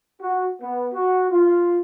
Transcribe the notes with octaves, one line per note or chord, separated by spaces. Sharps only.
F#4
B3
F#4
F4